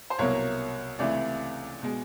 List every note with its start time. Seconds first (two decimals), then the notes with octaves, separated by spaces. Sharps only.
0.10 C5
0.18 C2 B2 F#3 A#3 C#5
0.99 C#2 C3 E3 A3 D5
1.82 B2 G#3